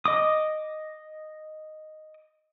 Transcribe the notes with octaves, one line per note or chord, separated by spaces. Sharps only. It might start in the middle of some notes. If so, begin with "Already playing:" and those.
D#5 D6 D#6